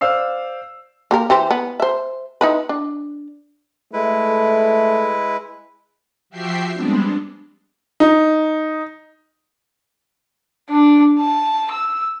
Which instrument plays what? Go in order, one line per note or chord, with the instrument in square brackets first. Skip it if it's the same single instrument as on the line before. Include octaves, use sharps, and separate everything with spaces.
[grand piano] C5 D5 F5 E6 C7
[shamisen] A#3 G4 A#4
E3 G4 C5
B3
C5 E5
D#4 E4 B4
D4
[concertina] G#3 E4 B4 [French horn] A3
[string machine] F3 F#4 G4 E5 G5 C7
G3 G#3 B3 C4 D4
[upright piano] D#4
[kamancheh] D4
A5
E6